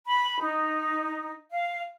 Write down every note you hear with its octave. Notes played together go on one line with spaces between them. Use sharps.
B5
D#4
F5